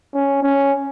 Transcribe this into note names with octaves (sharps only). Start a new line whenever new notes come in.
C#4
C#4